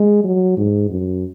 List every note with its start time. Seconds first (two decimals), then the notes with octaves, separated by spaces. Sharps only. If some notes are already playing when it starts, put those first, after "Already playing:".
Already playing: G#3
0.24 F#3
0.57 G#2
0.90 F#2